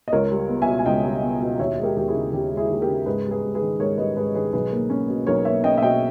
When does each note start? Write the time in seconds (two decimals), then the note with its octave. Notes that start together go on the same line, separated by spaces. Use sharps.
0.08 D#5
0.12 C#2 A#4 C#5
0.31 G3
0.49 B3
0.62 B2 E5 G#5
0.79 G#5
0.86 C#2 D#5 G5
1.03 G3
1.23 B3
1.41 B2
1.59 D#2 C#5 E5
1.78 G#3
1.83 G4 A#4
1.96 D#2 G4
2.08 E4 G#4
2.14 C#3
2.33 D#2 G4
2.51 G#3
2.57 E4 G#4
2.69 D#2
2.82 G4 A#4
2.89 C#3
3.06 G#2 G#4 B4
3.25 G3
3.31 G#4 B4
3.43 G#2
3.55 G#4 B4
3.61 D#3
3.80 G#2 A#4 C#5
3.98 G3 B4 D#5
4.17 G#2 G#4 B4
4.35 D#3 G#4 B4
4.53 B1 G#4 B4
4.72 A#3
4.90 C#4
5.08 B2
5.27 B1 A#4 C#5
5.45 A#3 C#5 E5
5.64 C#4 D#5 G5
5.78 E5
5.82 B2 D#5 G5